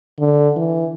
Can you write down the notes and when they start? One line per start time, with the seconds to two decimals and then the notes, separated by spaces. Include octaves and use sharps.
0.20 D3
0.56 E3